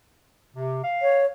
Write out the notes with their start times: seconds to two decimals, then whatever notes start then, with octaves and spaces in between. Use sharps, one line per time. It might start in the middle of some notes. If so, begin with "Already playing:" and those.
0.54 C3
0.83 F5
1.02 C#5